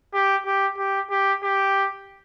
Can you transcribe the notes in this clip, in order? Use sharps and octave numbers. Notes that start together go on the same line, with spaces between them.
G4
G4
G4
G4
G4